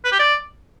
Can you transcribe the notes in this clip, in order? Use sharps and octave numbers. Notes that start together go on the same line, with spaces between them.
B4
G4
D5